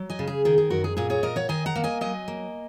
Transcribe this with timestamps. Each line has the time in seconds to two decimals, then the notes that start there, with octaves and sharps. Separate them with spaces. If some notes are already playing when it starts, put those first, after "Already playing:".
Already playing: F#3
0.10 D#5 G#5
0.19 C#3
0.27 G#4
0.45 D#3 G#4
0.58 G#4
0.70 F#2 F#4 A#4
0.84 G#4
0.97 A#2 G#4
1.10 G#4 C#5
1.23 A#2 A#4 D#5
1.36 C#5 F#5
1.49 D#3 D#5 G#5
1.66 F#5 A#5
1.75 A#3
1.84 D#5 G#5
2.01 F#3 D#5 G#5
2.28 A#3